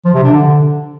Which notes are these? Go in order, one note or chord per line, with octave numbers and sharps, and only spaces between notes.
F3
C3
D4
D3